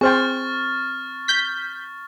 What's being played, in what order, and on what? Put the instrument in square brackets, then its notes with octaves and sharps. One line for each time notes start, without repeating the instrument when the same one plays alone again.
[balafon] C4 [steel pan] G#4 C5 G5 [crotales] C#6 F6 A6
[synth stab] G6 B6